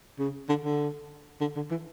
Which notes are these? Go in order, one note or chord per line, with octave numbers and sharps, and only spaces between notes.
C#3
D3
D3
D3
D3
E3